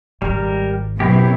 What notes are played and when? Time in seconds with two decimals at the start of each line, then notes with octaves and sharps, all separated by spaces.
0.22 G#1 G#2 G3 A#4
1.00 F#2 B2 C4 E4 G4